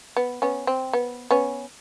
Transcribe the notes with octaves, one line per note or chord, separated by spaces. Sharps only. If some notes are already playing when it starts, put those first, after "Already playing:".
B3
B3 C#4
C4
B3
B3 C#4